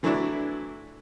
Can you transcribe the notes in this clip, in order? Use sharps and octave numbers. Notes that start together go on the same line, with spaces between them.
D3 E3 F#3 A3 D4 E4